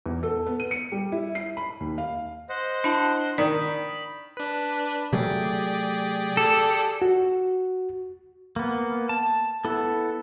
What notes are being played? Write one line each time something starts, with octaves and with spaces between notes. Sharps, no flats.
E2
A4
B3
D#7
C#7
G3
E4
C7
B5
D#2
F5
C5 D#5 F#5
D4 E4 A5
D#3 D5 B5
D4 B4
C3 F#3 A3 G4 G#4 D5
A4
F#4
A#3 B3
A5
B3 E4 A4